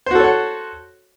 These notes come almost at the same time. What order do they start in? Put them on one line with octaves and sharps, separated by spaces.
C5 F#4 A4 C#5 F#5